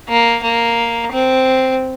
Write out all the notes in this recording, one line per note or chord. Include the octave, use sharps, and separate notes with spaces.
A#3
A#3
C4